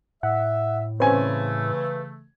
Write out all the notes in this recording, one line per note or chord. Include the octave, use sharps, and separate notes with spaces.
A2 E5 F#5
C#3 E3 A3 C4 C#4 B4 G#5